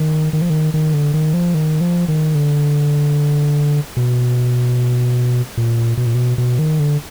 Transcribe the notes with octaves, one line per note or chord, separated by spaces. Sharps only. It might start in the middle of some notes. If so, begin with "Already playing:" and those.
Already playing: D#3
D#3
F3
D#3
D#3
D3
D#3
F3
D#3
F3
D#3
D3
B2
A#2
B2
A#2
B2
B2
D#3
D3